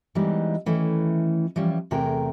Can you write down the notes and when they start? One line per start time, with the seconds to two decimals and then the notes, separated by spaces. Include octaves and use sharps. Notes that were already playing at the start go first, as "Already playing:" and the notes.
0.15 E3 G3 G#3 B3 C4 D#4
0.66 D#3 E3 A3 C#4
1.56 E3 F3 G3 C#4
1.91 E2 C3 A3 G#4 A#4 G5